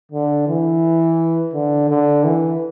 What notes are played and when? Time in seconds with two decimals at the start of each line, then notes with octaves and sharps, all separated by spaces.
0.12 D3
0.48 E3
1.53 D3
1.89 D3
2.24 E3